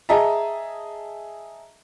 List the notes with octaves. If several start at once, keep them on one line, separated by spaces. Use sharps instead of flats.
G#4 D#5 E5 A5 A#5